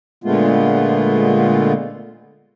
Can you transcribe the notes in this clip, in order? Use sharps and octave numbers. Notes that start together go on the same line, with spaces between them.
A#2 D3 G#3 A3 B3 F4